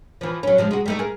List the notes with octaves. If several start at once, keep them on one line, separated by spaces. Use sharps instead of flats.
E3 F3
F#3 C#4
C3 F3 G#3
G#3 F#4
G3 A3 D#4
G#4 A#4